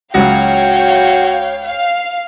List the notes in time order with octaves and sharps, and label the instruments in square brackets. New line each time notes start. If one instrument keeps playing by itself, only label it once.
[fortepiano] C#2 F#3 [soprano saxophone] F#4 [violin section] C#5 F5 [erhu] G5
[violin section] F5